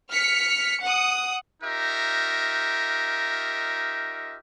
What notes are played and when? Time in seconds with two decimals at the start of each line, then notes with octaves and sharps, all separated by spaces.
0.11 F6 B6 C#7
0.83 F#5 D#6
1.62 D#4 F4 G4 A#4 D#5 E5